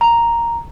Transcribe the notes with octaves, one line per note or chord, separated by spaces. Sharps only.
A#5